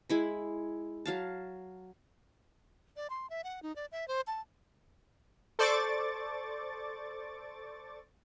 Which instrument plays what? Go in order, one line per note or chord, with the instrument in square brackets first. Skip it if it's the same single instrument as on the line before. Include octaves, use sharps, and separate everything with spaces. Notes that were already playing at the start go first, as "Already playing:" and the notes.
[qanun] G#3 E4 B5
F#3 F5 A5
[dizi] D5
C6
E5
F#5
D#4
D5
E5
C5
A5
[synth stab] A4 C5 D5 C#6 D6 A6